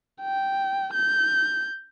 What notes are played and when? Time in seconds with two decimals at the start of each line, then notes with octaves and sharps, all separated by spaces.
0.22 G5
0.94 G6